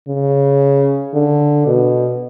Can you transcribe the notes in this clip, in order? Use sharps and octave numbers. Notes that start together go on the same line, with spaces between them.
C#3
D3
B2